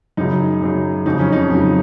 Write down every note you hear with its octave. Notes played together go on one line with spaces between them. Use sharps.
F#2 C#3 F#3 D#4
F#2 C#3 F#3
F2 C#3 F#3 D#4
C#4
D#4
F2 C#3 F#3